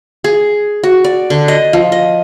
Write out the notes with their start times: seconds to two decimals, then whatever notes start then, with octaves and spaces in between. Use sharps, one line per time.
0.24 G#4
0.83 F#4
1.04 D5
1.30 D3
1.48 D#5
1.73 F3
1.92 D#5